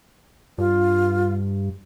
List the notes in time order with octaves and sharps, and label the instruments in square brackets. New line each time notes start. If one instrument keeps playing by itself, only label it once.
[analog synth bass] G2 [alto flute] F4